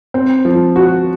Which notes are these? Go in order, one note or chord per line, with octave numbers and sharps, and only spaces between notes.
C4
F3
F#4